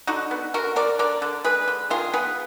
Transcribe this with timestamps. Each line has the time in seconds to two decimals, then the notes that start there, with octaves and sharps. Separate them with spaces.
0.07 D3 D#4 F#4
0.31 B3
0.54 D3 F#4 A#4
0.76 D3 A#4 D5
0.99 D3 A#4 D5
1.22 D3
1.44 G#3 G#4 B4
1.68 D3
1.90 D#3 F4 G#4
2.13 B3 G#4 B4